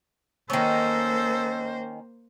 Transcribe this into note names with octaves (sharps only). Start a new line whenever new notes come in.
D#3 A#3 C#4 A4 C5